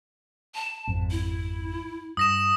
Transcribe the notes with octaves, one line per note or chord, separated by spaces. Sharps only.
A5
G#1 F2 G#2
E4
G2 D#6 A#6 E7